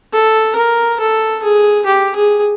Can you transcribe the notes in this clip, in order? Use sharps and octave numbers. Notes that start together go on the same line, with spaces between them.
A4
A#4
A4
G#4
G4
G#4